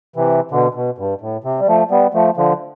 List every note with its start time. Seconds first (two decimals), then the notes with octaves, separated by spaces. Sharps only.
0.16 C3 E3
0.51 B2 D3
0.74 B2
0.98 G2
1.21 A2
1.44 C3
1.60 G3
1.67 F3 A3
1.90 G3 B3
2.14 F3 A3
2.37 D3 F3